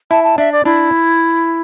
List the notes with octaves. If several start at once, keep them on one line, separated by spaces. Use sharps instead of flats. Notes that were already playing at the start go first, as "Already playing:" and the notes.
E4 A5
A5
D4 E5
D5
D4 E4